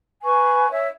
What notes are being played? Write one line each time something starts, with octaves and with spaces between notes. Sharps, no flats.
B4 G#5 C#6
C#5 E5